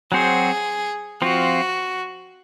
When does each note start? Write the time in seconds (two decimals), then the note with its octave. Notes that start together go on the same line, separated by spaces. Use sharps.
0.12 F#3 C4 F#4 G#4 C5
1.22 F3 C4 F4 F#4